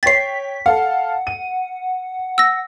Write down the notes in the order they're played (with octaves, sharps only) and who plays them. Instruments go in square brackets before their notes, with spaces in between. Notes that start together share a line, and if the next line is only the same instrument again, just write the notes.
[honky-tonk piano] C#5 G5 [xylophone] A6 C7 [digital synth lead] B6
[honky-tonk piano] A4 F5 [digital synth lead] F#5
[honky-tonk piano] D#7
[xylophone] E6 A#6